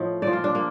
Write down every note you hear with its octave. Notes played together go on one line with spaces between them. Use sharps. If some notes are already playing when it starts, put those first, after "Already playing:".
Already playing: A2 F3 D#5
A#2 F3 D5
F4
D4
A#3